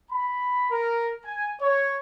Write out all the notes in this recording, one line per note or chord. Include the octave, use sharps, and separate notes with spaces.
B5
A#4
G#5
C#5